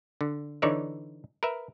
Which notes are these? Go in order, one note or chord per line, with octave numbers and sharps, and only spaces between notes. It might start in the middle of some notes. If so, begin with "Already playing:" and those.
D3
D3 E3 D#4 C#5 D5 E5
A#4 B4 E5